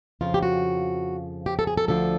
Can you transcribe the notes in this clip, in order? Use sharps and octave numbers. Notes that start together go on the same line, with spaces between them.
F2 C#3 F3 F4
G4
F#4
G4
A4
G#4
A4
D2 D3 F3 A4